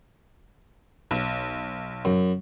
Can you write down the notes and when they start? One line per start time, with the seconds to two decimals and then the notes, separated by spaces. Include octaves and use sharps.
1.11 B1
2.05 F#2